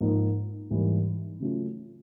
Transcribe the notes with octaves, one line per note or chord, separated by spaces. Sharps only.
G#2 F3 A#3 D#4
G#2 E3 G3 A#3
C#3 F#3 A3 C#4 F4